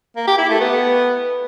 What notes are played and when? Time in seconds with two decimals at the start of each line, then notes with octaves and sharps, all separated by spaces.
0.16 A#3
0.27 G4
0.38 E4
0.49 A3
0.60 B3